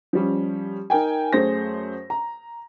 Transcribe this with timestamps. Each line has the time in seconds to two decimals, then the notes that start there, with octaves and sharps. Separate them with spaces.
0.13 F3 G3 C#4
0.90 D#4 A#4 G5 G#5
1.33 F#2 A3 G#4 C5 A#6
2.10 A#5